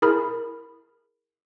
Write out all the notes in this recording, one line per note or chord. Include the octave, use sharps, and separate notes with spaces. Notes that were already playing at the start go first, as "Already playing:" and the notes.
E4 G#4 A#4 B5 F6